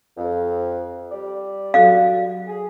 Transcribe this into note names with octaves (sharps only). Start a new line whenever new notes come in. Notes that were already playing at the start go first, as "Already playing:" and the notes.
F2
G3 D5
F#3 F#4 A4 F5
G#4